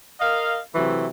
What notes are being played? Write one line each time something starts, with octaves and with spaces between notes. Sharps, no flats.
A#4 D#5 F5
C3 E3 F#3 A3